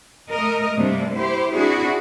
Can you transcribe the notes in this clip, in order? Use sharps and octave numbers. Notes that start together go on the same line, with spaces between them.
A3 A#4 D#5
G2 C3 G3 A3 A#3 D4
E4 G4 C5
C4 D4 E4 F#4 G#4